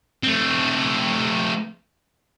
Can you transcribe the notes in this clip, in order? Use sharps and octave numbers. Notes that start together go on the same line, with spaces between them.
A3 C4